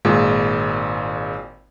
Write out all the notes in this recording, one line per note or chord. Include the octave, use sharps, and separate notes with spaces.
G#1 A#2 G#3